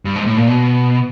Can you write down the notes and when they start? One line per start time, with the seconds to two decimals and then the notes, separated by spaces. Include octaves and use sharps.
0.05 G2
0.16 G#2
0.26 A2
0.37 A#2
0.48 B2